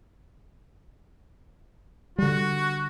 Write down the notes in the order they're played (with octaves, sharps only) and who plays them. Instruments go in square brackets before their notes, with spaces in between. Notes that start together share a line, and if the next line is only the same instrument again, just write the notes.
[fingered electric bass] D3 G3 [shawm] F#4